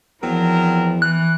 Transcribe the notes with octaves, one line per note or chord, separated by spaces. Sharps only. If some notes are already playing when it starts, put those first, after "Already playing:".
E2 F3 F#3 C4 A#4
E3 F#6